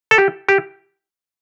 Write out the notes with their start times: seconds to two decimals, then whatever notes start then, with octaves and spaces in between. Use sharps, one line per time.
0.11 A4
0.18 G4
0.49 G4